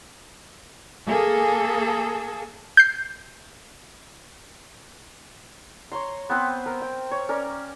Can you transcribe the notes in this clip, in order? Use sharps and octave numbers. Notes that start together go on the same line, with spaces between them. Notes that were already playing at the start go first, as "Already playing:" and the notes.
A#3 G#4 A4
G6 C7
C#5 A#5 C6
B3 C4 B4 C5
A#4
G5
C#5
C#4 A#4 D5